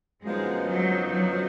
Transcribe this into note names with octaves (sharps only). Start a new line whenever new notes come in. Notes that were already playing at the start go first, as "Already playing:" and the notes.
F#2 D3 F3 G#3 B3 D#4
F#3
F#3